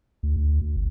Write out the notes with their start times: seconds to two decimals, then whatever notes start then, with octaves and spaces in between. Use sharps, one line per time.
0.23 D2
0.36 D2
0.61 D2
0.76 G1